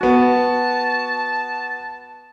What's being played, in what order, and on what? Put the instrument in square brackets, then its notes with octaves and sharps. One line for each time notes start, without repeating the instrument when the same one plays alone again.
[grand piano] B3 F#4 [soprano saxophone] A5